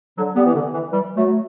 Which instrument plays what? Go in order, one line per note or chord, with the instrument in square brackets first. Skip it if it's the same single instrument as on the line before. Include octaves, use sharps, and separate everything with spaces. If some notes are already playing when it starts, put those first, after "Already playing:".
[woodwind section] D3 F#3
G3 B3
E3
D3
E3
E3 G3
F#3 A3